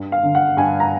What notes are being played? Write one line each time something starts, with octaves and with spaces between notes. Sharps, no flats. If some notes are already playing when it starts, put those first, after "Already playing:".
Already playing: G2
F5
D3
F#5
G2 G#5
A#5